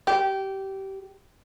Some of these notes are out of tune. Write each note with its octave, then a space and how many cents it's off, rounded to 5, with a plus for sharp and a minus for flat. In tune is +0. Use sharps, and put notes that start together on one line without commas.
G4 -20